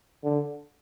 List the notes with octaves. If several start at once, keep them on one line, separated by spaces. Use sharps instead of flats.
D3